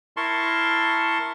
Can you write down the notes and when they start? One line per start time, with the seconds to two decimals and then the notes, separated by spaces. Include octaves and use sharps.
0.17 E4 A#4 A5 C6 C#6